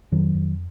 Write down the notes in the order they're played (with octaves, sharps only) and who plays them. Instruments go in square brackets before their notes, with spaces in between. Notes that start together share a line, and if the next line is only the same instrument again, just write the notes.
[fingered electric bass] F2 D#3 F#3
F2